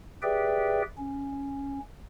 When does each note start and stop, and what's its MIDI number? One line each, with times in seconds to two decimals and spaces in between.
0.22 0.82 67
0.22 0.82 68
0.22 0.82 71
0.22 0.82 74
0.22 0.82 76
0.22 0.82 79
0.98 1.79 61